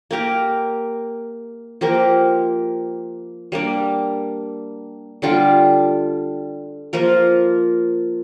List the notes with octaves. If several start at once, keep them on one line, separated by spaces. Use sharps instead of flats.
A#3 G4 A#4
F3 A#3 G4 A#4
G3 A#3 D4
D3 G3 D4 F4
F3 A#3 F4 A#4